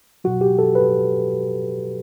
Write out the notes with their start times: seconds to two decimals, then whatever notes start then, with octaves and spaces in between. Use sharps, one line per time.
0.24 B2 F#3 F#4
0.41 G4
0.59 A4
0.75 B4